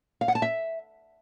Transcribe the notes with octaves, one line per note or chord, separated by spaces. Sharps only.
F5
F#5
A5
E5